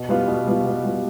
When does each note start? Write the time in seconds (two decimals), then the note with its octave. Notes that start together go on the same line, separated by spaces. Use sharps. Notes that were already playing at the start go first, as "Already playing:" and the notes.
Already playing: B2
0.09 G3 B3 F4
0.28 B2
0.47 G3 B3 F4
0.65 B2
0.84 G3 B3 F4